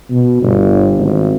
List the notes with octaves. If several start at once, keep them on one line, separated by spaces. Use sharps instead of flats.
B2
G1
G#1